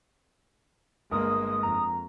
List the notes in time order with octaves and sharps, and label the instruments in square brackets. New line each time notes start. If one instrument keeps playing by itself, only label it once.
[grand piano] G1 A#4 [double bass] G#3 A#3 [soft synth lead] D#6
[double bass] F2 [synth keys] A#5